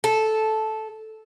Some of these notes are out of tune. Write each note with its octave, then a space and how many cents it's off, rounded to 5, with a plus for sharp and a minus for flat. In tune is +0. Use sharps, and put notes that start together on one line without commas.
A4 -10